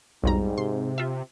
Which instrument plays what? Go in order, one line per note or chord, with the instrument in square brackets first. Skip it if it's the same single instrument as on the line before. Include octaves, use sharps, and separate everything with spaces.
[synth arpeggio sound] B1 F2 A#5 [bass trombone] G#2 [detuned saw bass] G3
[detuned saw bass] C3 [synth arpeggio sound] C6
[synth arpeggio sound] F4 E5